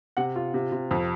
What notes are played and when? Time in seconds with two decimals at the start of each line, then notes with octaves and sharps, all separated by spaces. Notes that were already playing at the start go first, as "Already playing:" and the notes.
0.17 C3 F#5
0.36 F4
0.54 C3
0.72 C3
0.91 F2